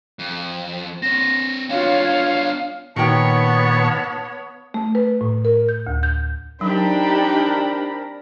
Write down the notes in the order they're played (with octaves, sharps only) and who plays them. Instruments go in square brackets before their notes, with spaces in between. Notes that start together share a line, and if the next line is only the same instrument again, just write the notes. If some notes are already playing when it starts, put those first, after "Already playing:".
[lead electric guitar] F2
[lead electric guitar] C4 C#5 [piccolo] A#6
[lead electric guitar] B3 D4 [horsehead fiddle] F4 C#5 [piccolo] F5
[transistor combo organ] A#2 C#6 [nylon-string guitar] D#3 F#4 G5 [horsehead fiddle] B3 C#5 [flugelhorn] A5
[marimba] A3
B4
A2
A#4
G6
D2
G6
[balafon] F#3 [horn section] C4 A#4 B5 [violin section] D4 [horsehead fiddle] D#4 G4